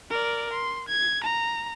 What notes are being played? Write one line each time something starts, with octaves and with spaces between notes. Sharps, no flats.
A#4 D5
C6
G#6
A#5